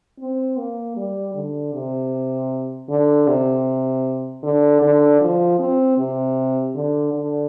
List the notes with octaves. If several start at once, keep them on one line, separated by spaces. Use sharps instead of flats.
C4
A#3
G3
D3
C3
D3
C3
D3
D3
F3
C4
C3
D3
D3